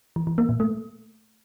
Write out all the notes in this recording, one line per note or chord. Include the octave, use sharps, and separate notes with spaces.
E3
E3
A#3
A#2
A3